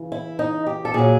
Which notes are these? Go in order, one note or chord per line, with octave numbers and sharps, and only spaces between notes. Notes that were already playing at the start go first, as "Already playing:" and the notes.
Already playing: C#3 E3
E4
D#4
G4
A4
A#2 F#3 G#4